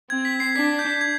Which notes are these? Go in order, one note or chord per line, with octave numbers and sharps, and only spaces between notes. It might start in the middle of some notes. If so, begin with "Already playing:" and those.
C4 G#6
B6
C7
D4 B6
G6
G#6